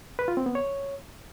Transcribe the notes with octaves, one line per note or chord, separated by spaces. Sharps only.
B4
F4
C4
B3
C#5